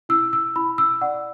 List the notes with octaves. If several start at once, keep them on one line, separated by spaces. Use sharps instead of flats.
E4 E6
E6
E4 B5
E6
D5 F#5